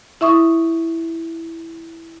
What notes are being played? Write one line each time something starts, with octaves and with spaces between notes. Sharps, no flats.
E4 E5 C#6 D#6